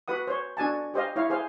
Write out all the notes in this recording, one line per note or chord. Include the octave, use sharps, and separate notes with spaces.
F#4 B4 F#5 D#6
C5 C#5
D4 F#4 G#5 A5
G4 C5 D#5 F5
E4 C#5 F5
G#4 C5 F5